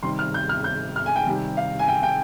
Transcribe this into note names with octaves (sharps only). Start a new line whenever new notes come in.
C3 D#3 G3 C6
F6
G6
F6
G6
F6
G#5
G5
C3 D#3 G3
F5
G#5
G5
G5